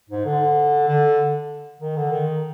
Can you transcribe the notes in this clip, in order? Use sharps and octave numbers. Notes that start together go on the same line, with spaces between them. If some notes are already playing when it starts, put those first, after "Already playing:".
G#2
D3
D3
D#3
D3
D#3